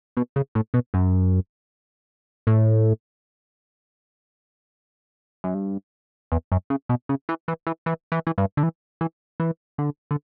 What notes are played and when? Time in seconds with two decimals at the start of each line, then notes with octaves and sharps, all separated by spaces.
0.17 B2
0.36 C#3
0.55 A2
0.74 B2
0.94 F#2
2.47 A2
5.44 F#2
5.54 G2
6.32 E2
6.52 F#2
6.70 C#3
6.89 B2
7.09 C#3
7.29 E3
7.48 E3
7.67 E3
7.86 E3
8.12 E3
8.27 E3
8.38 G2
8.57 D3
8.63 E3
9.01 E3
9.40 E3
9.78 D3
10.11 D3